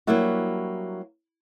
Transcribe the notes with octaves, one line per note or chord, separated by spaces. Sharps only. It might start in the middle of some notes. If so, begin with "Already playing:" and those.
F#3 G3 A#3 D4 E4 F#4